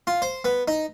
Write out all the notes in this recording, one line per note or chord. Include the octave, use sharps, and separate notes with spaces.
F4
C5
B3
D#4